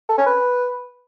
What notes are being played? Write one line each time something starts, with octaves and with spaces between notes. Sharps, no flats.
A4
C#4
B4